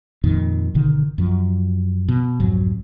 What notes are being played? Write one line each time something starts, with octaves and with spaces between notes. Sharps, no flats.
F2 A#2 D#3
G1 B2 D3 D#3
F#2 F3
B2
C2 F2 G#2 F#3